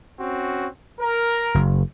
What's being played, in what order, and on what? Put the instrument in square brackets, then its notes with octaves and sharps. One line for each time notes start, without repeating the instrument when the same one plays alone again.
[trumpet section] C4 C#4 F#4
A#4
[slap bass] F#1